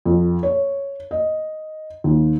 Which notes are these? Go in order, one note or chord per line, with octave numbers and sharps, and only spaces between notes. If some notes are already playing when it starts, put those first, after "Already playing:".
F2
C#5
D#5
D#2